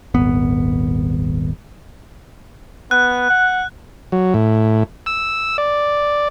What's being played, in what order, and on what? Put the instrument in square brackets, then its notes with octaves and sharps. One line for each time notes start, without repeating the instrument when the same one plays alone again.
[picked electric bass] D#1 G#1 B3
[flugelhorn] B3 [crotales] F#6
[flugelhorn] F#5
[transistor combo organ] F#3
A2
E6
D5